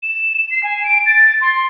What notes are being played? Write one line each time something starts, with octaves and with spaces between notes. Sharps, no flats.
E7
C7
G#5
D7
A6
C6